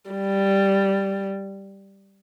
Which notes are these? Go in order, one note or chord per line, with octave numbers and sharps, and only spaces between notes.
G3